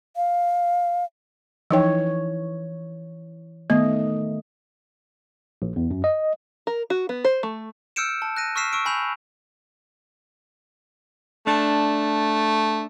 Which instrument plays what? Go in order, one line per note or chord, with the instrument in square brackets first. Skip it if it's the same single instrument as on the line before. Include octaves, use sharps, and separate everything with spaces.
[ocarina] F5
[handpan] E3 C#5 [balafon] F3 D#4 G5
[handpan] D#3 A3 D#5 [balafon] B3
[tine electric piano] A#1
E2
F#2
D#5
[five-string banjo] A#4
F#4
B3
C5
A3
[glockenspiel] E6 F6 G6 C#7 D7 E7
A5
F#6 A#6 D#7
C#6 E6 F6 B6 C7 E7
C#6 E6 D7
G#5 B5 G6 F7
[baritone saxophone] A3 [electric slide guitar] D4